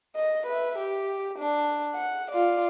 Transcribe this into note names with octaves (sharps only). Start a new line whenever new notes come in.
D#5
B4 E5
G4
D4
F#5
F4 D5